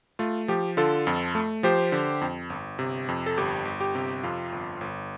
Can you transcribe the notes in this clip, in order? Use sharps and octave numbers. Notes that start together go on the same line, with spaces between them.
A3 F4
F3 G4
D3 F4 A4
F2
A3
F3 G4 C5
D3
F2
G1
C3
F2
A4
G1 G4
G1
G4
C3
F2 F4
G1
G1